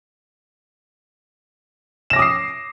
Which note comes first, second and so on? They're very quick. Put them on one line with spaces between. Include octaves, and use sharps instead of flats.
E7 A#6 D6 D#6 C7